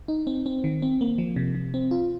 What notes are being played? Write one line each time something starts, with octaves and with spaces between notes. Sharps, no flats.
D#4
C4
C4
D#3
C4
A#3
F3
C3
C3
C4
F4